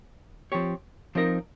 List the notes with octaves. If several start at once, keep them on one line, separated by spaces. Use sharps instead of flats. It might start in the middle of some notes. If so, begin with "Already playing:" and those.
F3 C4 G4 C#5
F3 C4 D#4 A#4 D#5